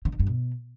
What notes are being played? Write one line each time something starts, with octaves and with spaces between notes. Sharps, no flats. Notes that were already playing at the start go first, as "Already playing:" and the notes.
D3
D#3
G2
B2